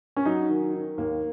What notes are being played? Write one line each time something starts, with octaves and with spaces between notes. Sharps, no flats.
C#4
F#3 D#4
D#3
D#3
D#2 A#3